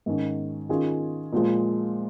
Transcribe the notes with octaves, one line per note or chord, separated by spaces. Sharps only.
G#2 D#3 C#4
D#3 C#4 F4 G#4
A#2 F3 G#3